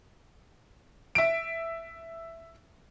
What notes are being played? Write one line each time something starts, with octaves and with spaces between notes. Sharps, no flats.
E5 D7